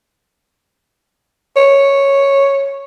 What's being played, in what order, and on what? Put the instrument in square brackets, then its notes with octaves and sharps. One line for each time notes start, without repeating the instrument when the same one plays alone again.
[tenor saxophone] C#5